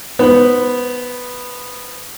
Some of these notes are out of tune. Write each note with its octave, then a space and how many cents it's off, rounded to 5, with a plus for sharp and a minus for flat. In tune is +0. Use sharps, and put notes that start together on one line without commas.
B3 +0 C5 -15 B5 +0